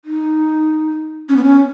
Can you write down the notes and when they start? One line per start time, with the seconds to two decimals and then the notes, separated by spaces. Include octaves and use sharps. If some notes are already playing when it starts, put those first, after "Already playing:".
0.05 D#4
1.29 C#4
1.36 B3
1.43 C#4